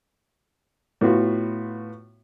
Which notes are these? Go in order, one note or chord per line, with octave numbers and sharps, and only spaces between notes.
A2 B3 F4 F#4